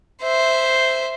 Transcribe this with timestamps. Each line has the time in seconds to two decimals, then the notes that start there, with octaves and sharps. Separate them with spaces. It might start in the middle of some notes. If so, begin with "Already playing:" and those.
0.22 C5 E5